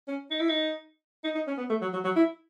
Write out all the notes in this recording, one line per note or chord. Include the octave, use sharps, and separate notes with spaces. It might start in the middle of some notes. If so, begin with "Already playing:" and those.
C#4
D#4
E4
D#4
D#4
D#4
C#4
B3
A3
F#3
F#3
F#3
E4